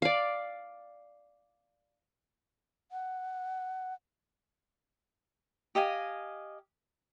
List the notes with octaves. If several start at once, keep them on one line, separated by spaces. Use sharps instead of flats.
D5 F5
F#5
G4 D#5 F5 G#5